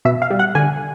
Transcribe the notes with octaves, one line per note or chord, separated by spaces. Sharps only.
B2 E5
F5
G3
F#5
D3 G#5